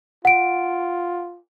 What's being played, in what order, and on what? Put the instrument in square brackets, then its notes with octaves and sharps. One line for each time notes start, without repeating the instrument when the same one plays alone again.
[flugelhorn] F4 [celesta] F#5 D7